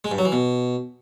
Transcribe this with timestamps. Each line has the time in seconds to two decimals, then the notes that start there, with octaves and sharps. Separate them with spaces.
0.05 G#3
0.11 G2
0.18 F#3
0.25 E3
0.32 B2